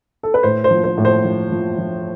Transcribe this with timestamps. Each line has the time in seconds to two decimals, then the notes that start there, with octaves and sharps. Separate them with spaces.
0.23 A4
0.34 B4
0.43 A2 C5
0.64 C5
0.71 F3
0.84 C5
0.98 A2
1.05 C5
1.25 F3
1.52 F3
1.78 F3